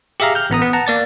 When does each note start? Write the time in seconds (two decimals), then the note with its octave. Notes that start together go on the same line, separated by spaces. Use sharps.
0.20 G4 G#4 E5 F5 A#5
0.35 F6 G6
0.50 A1 B3 A#5 D#6
0.62 B3
0.73 F#5 A5 A#5
0.87 A#3 D5 A6